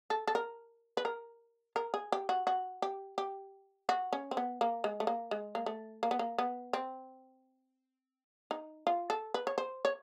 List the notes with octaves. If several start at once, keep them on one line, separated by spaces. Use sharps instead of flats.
A4
A4
A#4
B4
A#4
A#4
G#4
G4
F#4
F#4
G4
G4
F#4
C#4
C4
B3
A#3
G#3
A3
A#3
G#3
A#3
A3
A#3
B3
A#3
B3
C4
D#4
F4
A4
B4
C#5
C5
C#5